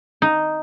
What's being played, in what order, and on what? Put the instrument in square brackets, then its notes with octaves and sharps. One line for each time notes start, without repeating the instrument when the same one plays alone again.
[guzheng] D#4